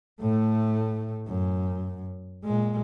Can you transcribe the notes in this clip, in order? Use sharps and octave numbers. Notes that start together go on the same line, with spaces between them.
A2 A3
F#2
A#2 G#3